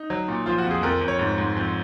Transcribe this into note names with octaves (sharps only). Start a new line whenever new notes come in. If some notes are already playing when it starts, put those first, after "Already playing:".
Already playing: D#4
F#3
A#2
F3 F4
F#4
F2
G#4
F2 A#4
F2
C#5
G#2
G#2
F2